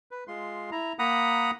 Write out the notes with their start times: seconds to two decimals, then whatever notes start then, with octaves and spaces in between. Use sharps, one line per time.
0.11 B4
0.28 G#3 F4 C6
0.71 E4 A#5
0.99 A#3 F#5 A#5 B5 D#6